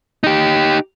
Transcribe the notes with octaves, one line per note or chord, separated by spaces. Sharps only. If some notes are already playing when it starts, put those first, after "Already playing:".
D#4 G4